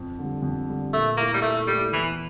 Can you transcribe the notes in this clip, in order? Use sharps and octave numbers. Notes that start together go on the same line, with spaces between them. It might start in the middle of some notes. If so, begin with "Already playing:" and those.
Already playing: F2
D3 G3
F2
D3 G3
A#2 A3
A3 A#3 E4 A4
G3
A#2 A3
G3 A3 E4 A4
E2 E3